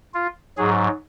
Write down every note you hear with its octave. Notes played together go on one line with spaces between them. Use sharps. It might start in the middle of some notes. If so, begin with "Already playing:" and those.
F4
G#2 F#3 G#4